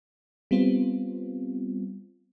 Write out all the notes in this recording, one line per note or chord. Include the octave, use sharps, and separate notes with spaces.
G3 B3 C4 F4